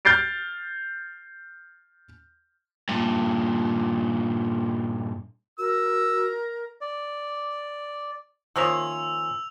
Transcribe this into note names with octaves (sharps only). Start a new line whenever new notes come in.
F6 G6 A6 C7 D7
G2 A#2
F#4 A#4 E6
D5
D#3 F3 A#3 C#4 A#4 E5 E6 F7